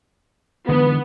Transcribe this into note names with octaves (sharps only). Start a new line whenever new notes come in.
D3 E3 G#3 B3